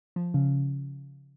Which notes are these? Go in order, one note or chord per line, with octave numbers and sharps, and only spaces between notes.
F3
C#3